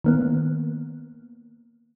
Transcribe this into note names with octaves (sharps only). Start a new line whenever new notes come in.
D#3 A#3 B3